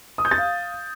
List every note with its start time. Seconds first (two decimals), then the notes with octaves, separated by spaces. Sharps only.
0.18 D#6
0.25 G6
0.31 A6
0.38 F5